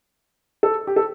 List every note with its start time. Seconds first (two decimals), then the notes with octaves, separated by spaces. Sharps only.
0.63 A4
0.87 G4
0.96 A4